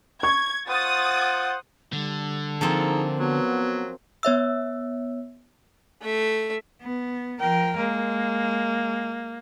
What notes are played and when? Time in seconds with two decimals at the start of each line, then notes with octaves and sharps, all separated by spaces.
0.23 C#6 G#6
0.68 F4 C5 F#5 D#6 A6
1.93 D3 G3
2.61 F3 A#3 C4 D#4 G#4 A4 A#5
3.18 F#3 B3
4.23 B3 C#5 E5 E6
6.02 A3 E5
6.82 B3
7.40 F3 A#4 G5
7.77 G#3 A#3